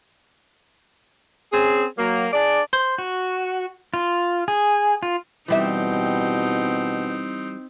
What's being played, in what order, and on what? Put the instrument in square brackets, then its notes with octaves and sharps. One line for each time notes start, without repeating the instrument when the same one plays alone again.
[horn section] C4 C#4 G#4
F#3 A#3
D4 G#4 D5
[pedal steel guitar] C5
F#4
F4
G#4
F4
[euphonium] B2 [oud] E3 G3 E5 [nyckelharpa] C4 D#4